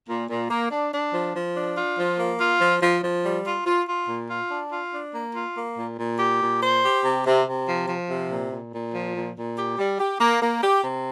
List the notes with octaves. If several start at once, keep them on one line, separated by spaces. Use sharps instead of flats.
A#2
A#2
A#3
D4
D4
F3
F3
D4
F4
F3
A#3
F4
F3
F3
F3
G3
F4
F4
F4
A#2
F4
D4
F4
D4
A#3
F4
A#3
A#2
A#2
G4
A#2
C5
G4
C3
C3
C3
F3
F3
C3
A#2
A#2
A#2
F3
A#2
A#2
G4
G3
G4
A#3
A#3
G4
C3